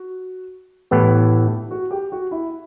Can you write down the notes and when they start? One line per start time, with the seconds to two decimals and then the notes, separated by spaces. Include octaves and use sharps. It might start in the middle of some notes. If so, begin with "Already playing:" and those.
Already playing: F#4
0.91 A2 E3 B3 G4
1.71 F#4
1.91 G4
2.12 F#4
2.31 E4